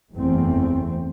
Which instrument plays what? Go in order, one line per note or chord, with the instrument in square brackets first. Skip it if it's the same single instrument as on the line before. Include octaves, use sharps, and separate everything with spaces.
[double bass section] F#1 E2 A3 C4